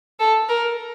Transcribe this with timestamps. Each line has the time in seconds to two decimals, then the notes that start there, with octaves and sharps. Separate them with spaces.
0.20 A4
0.49 A#4